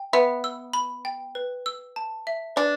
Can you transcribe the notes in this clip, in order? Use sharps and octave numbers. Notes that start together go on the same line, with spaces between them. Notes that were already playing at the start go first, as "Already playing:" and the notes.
Already playing: G5
B3 E5
E6
B5
G5
B4
E6
A5
E5
D4 B4